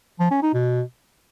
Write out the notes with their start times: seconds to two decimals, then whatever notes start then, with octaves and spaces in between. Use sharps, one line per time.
0.20 F3
0.31 C#4
0.42 D#4
0.54 B2